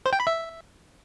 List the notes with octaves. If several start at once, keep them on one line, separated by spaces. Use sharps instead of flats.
C5
G5
B5
E5